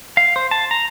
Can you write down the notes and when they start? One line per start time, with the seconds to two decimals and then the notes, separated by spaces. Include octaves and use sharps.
0.17 F5
0.36 C5
0.51 A5
0.71 A#5